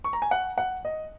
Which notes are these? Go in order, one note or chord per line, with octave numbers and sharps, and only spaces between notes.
C#6
A#5
G#5
F#5
F#5
D#5